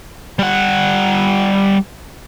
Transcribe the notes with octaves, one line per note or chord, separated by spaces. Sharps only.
G3 F#5